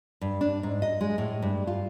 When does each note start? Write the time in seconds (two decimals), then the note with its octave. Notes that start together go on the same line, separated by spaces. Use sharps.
0.21 G2
0.41 D4
0.63 G#2
0.82 D#5
1.01 G#3
1.18 A2
1.42 G2
1.67 F4